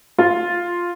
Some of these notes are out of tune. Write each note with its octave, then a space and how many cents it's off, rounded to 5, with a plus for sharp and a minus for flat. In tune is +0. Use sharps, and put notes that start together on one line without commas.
F4 +0